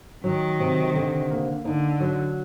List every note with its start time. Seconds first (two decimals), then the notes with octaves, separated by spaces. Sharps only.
0.24 D#3 F#3
0.60 C3
0.95 D3
1.30 A#3
1.65 D3 D#4
2.01 F#3